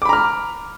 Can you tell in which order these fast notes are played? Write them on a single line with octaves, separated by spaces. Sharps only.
D6 B5 A#5 F6